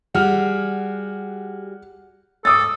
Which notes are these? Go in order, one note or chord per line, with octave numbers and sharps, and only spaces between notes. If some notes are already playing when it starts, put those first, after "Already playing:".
G3 F#4 G#4 F#5 F6
G#2 A4 D6 D#6 A6